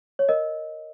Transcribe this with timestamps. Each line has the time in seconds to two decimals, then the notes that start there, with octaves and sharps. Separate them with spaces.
0.19 C#5
0.29 A#4 D#5